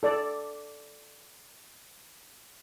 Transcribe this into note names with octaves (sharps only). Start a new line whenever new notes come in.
A4 D5